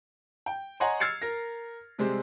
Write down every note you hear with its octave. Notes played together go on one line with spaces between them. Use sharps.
G5
C#5 D#5 F#5 G#5 A#5 C6
E6 F6 G#6 A6 C7 C#7
A#4 A#6
C3 G3 G#3 C4